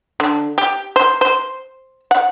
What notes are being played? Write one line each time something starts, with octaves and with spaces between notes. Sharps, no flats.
D3
G4
C5
C5
F#5